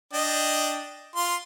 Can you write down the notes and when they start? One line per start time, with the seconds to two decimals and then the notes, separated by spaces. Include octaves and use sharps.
0.13 D4 D#5 G5
1.16 F4 C6